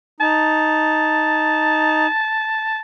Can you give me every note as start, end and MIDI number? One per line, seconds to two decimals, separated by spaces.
0.20 2.07 63
0.20 2.80 81